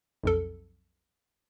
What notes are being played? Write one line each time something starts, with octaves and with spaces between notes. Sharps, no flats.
B1 F2 A4